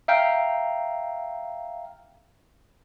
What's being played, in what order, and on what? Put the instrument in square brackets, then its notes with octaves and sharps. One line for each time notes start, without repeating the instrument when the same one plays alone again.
[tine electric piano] E5 F5 G5 A#5